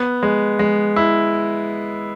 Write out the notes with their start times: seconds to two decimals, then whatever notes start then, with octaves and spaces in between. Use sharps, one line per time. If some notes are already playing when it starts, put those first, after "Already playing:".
Already playing: B3
0.23 G#3
0.59 G#3
0.96 E4